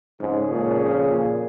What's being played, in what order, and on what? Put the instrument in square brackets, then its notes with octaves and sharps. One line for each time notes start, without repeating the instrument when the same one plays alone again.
[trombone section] F2 C#3 F3 C#4 G#4 [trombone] G#2
[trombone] A#2
A#2